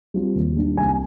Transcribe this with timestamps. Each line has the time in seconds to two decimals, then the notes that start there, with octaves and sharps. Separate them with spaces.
0.14 G3 C4 F4
0.35 D#2
0.56 D#3 G3 A#3 D4
0.77 C2 G#5